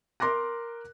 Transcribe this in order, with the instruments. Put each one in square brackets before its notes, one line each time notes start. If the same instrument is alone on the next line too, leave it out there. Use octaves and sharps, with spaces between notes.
[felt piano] A#4 C6 D6 F#6 A#6